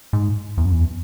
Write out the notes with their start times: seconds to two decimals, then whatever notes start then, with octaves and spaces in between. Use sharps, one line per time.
0.13 G#2
0.58 E2
0.65 F#2
0.72 E2